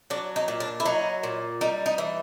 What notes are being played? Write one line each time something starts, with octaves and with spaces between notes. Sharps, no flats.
F#3 D4
D#4
A#2
D4
E4
F#3 D#4
A#2
G3 D#4
D#4
E3